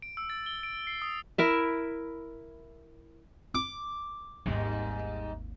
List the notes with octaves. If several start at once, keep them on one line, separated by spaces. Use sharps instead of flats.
D7
E6
A6
G7
D7
C7
D#6
E4 A#4 E5
D6
G#1 D#2 G#2 G3 D#4